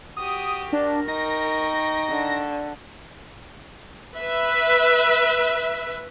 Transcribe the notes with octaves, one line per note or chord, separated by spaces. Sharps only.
F#4 G4 D#6
D4 A#4
D#4 G5 C#6 A#6
D3
B4 E5